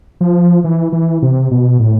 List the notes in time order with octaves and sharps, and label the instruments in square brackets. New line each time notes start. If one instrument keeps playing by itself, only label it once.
[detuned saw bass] F3
E3
E3
C3
B2
A2